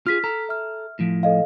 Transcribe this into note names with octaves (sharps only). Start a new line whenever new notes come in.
F4 G#4 F6 B6
A4 A#5
E5 F6
A2 F3
A4 D#5 F5